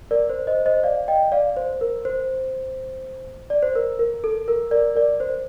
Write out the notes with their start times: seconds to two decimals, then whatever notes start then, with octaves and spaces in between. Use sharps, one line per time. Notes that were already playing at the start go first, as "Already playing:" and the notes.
0.11 A#4 D5
0.30 C5
0.47 C5 D#5
0.66 C5 D#5
0.83 D5 F5
1.08 D#5 G5
1.32 D5 F5
1.57 C5
1.81 A#4
2.05 C5
3.50 D5
3.63 C5
3.75 A#4
3.99 A#4
4.24 A4
4.48 A#4
4.71 A#4 D5
4.96 A#4 D5
5.20 C5